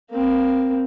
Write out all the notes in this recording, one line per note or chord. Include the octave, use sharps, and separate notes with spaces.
A#3 C4